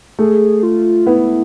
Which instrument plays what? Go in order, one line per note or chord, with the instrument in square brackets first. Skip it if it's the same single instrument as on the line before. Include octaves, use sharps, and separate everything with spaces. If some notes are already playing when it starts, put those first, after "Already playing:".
[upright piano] A3 [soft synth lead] G#4
[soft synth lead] F4
[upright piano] B3 [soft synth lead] E4